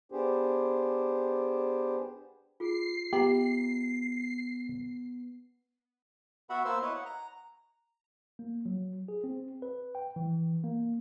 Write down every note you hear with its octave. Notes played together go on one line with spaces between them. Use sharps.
B3 D4 G4 G#4 C5
F4 G#4 C7
B3 G4 E5 A#5 B5
B3 F#4 E5 F#5 B5
A#3 B3 C5 E6
E4 B4 C#5 D#5
F#5
A#5
A#3
F#3
G#4
C4
B4
G5
E3
A#3